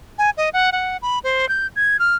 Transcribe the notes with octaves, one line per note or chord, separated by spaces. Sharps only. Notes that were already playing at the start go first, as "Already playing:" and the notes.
G#5
D#5
F#5
F#5
B5
C5
G6
G#6
F6